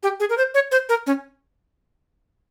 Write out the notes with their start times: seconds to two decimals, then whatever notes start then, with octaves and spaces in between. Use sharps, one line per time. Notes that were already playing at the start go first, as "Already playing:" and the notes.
0.03 G4
0.20 G#4
0.30 A#4
0.38 C5
0.54 C#5
0.72 C5
0.89 A#4
1.07 C#4